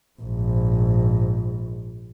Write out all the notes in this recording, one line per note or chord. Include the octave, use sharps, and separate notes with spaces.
A#1 G#2